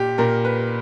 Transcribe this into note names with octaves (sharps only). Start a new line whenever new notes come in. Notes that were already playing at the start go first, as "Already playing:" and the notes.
Already playing: A#2 G4
A#2 A#4
B4